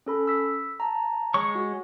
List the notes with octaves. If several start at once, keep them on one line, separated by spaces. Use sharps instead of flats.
C#4 A4 B5
E6 B6
A5 A#5
G#3 C#5 C#6
F#4